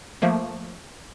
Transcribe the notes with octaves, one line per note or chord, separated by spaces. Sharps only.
F3 A3 A#3